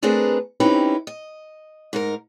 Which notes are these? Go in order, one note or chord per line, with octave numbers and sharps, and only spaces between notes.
A3 C4 D4 G#4 A#4 B4
C4 C#4 D#4 E4 G4 B4
D#5
G#2 D#4 A#4